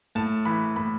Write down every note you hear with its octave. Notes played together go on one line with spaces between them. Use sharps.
A2 A5
E3 B5
A2 B5